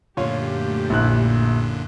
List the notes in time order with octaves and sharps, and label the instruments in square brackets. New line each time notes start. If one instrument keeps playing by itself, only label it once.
[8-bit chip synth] F#2 A#2 D3 [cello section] F#3 A3 G4 [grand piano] F4 C#5
[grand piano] A#1 E4 F#6